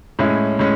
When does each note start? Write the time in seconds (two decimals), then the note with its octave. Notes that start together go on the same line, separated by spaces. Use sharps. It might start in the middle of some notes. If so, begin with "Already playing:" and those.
0.19 A2 G#3 C#4 E4
0.59 A2 G#3 C#4